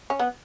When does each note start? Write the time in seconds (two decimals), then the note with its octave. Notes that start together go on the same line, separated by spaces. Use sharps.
0.10 C#4
0.19 B3